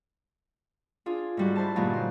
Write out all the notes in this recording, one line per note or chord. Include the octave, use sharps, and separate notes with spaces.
D4 F4 G#4
G#2 G3 F#4
E4 C5 A5
G2 A#2 D3 F#3 G#3 D#4
C5